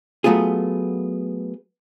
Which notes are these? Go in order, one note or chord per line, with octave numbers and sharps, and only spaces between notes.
F#3 A3 B3 F4 G#4